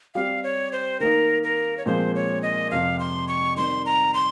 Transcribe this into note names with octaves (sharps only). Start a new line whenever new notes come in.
G3 C4 G4 F5
C#5
C5
D#3 A#3 D#4 A#4
A#4
C#5
A#2 F3 G#3 C4 F4 C5
C#5
D#5
F2 C3 F3 F5
C6
C#6
D#3 G3 C4 C6
A#5
C6